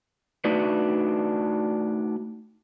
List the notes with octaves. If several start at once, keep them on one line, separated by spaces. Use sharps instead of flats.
A3 D4 D#4 F#4 B4 D5